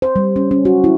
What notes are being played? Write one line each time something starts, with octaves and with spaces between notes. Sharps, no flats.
C5
G3
C#4
C#4
F#4
E4